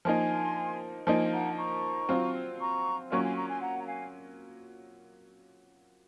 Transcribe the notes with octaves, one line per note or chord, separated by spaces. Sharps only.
F3 A#3 D#4 G#5 C6
F3 A#3 D#4 G#5 C6
F#5 A#5
A#5 C#6
F#3 C4 F4
A#5 C#6
F#3 A#3 C#4 F4 A#5 C#6
G#5 C6
A#5 C#6
G#5 C6
F#5 A#5
A#5
F5 G#5